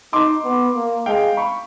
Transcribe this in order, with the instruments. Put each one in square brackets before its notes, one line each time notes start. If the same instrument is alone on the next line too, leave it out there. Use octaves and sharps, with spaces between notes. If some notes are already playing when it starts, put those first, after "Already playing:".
[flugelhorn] D#4 [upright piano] C6 D6
[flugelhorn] B3
A#3
[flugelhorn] G#3 [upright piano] F5 G5
[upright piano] B5 C#6